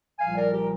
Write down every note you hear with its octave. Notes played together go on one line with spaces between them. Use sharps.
C2 A#2 F3 F5 G#5
A#4 D5
G4 A#4